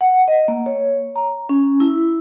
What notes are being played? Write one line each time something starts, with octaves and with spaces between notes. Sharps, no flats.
F#5
D#5
A#3
C#5
A#5
C#4
E4